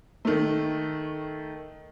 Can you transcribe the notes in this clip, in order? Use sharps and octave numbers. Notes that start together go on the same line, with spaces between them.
D#3 A3